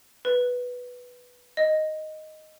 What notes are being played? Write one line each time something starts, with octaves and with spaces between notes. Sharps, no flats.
B4
D#5